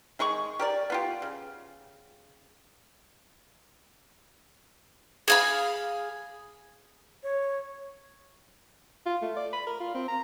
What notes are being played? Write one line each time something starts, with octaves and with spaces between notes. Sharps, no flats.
D#3 G#3 G#4 C#6
G4 A#4 D5
B3 F4 G4
C#3
G#4 F5 B5
C#5
F4
A3
D5
B5
A#4
F4
C4
A#5